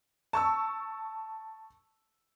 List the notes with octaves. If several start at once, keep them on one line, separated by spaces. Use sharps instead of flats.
A5 C#6 E6